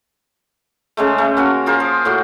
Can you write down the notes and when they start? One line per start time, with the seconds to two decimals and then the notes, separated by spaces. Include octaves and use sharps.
0.97 C#3 G#3 A3
1.18 A3
1.37 A#3 C#4 F#4
1.66 F4 G#4 A#4 C5
1.80 F3
2.05 A2 F#4